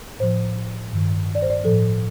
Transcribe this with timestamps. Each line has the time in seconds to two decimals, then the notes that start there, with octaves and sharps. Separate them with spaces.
0.20 A2 F3 C5
0.92 G2 D#3
1.35 D5
1.42 C5
1.50 D5
1.64 A2 F3 A4